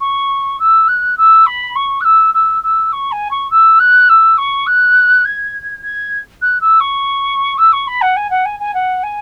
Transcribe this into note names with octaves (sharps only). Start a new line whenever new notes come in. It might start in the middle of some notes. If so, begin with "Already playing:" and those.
C#6
E6
F#6
E6
B5
C#6
F#6
E6
E6
E6
C#6
G#5
C#6
E6
F#6
E6
C#6
F#6
G#6
G#6
F#6
E6
C#6
E6
C#6
B5
F#5
G#5
F#5
G#5
G#5
F#5
G#5